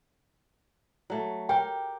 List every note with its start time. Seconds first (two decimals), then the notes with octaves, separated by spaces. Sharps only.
1.10 F#3 A3
1.49 G4 A#4 G5